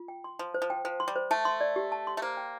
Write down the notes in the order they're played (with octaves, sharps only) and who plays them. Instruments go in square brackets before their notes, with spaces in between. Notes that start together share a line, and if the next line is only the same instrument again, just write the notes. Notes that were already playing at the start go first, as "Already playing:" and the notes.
Already playing: [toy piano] F4
G5
C6
[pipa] F3 [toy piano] C6
[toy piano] C5
[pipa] F3
[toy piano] G5
[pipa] F3 [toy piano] C5
[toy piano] C6
[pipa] G3
[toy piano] C5
[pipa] A3 [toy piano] A5
[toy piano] C6
D5
G4
A5
C6
[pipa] A3
[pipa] A#3 [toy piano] C5
[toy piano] G5